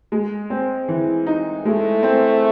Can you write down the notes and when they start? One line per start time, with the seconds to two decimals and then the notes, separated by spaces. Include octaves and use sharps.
0.12 G#3
0.50 C4
0.89 E3
1.27 D#4
1.65 G#3 A3
2.03 C4